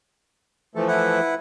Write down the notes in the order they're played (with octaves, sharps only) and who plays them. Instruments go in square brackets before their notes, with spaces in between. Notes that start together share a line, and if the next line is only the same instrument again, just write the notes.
[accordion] E3 F3 A3 [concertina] A4
[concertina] E4 B4 F#5